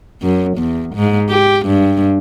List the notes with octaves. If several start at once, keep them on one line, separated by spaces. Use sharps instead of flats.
F#2
E2
G#2
G4
G2